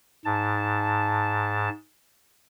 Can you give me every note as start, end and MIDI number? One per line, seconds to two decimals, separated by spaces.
0.25 1.69 44
0.25 1.69 81